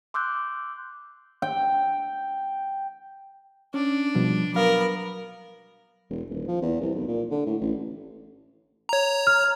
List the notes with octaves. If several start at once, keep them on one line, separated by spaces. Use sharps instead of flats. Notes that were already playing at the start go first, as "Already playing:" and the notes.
C6 D6 E6 F#6 G6
G5
C#4 D4
B2 F3 G3
F#3 B3 A#4 F5
E1
D#1
F3
E2
C2
B1
A#2
D3
A2
A1
C#5 A#5
F6